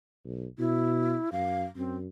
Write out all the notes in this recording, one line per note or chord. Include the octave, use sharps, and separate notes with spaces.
B1
B2 E4
F#2 F5
F#2 C4